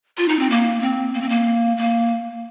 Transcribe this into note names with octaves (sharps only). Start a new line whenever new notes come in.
F4
D#4
C4
A#3
C4
A#3
C4
A#3
A#3